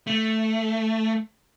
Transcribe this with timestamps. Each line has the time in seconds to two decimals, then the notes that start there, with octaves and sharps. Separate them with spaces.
0.07 A3